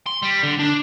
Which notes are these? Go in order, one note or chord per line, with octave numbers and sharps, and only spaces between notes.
C6
G3
D3
D4